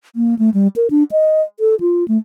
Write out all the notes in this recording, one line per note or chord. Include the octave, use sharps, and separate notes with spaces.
A#3
A3
G3
A#4
D4
D#5
A4
F4
A3